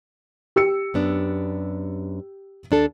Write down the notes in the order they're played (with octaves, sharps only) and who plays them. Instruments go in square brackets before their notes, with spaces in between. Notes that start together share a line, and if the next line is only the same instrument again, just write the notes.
[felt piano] G4 E6 C#7
[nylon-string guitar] F#2 B3 D4
D#2 D4 A4